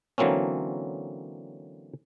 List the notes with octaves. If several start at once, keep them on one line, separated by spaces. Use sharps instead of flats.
D3 E3 F#3 A#3 C4 C#4